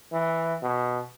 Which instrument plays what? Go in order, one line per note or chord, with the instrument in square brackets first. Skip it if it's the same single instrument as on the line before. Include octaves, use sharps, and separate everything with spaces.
[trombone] E3
B2